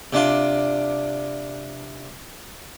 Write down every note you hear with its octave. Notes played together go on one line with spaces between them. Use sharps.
C3 D4 F4